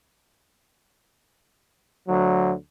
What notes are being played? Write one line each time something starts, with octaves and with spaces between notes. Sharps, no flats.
D2 F#3